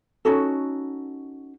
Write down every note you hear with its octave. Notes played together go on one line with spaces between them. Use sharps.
C#4 D#4 F#4 A4